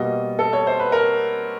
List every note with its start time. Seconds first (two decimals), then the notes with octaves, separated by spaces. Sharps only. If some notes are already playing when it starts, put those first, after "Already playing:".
Already playing: B2 G3 A#3 D#5
0.39 A4
0.53 C#5
0.67 C5
0.79 B4
0.92 A#4